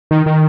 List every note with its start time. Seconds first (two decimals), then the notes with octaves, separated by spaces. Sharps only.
0.11 D#3
0.26 D#3